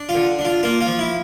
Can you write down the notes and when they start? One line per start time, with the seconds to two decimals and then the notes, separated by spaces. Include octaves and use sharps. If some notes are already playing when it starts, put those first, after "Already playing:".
Already playing: D4
0.09 F4
0.15 D3
0.39 D4
0.45 F4
0.63 A#3 F4
0.81 F4
0.87 F3
0.99 E4